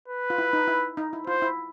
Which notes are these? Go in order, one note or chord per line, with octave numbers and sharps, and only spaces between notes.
B4
F4
E4
D#4
E4
D#4
E4
F4 C5
E4